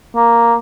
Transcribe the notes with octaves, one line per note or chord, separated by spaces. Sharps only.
A#3